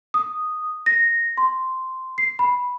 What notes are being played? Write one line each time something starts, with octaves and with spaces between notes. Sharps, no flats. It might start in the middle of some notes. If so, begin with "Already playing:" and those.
D#6
A#6
C6
C7
B5